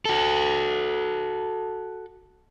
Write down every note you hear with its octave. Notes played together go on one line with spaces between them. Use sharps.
F#4 A4